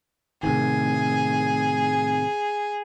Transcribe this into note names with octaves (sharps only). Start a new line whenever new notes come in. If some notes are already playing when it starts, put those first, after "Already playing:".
A2 C3 D#3 G#4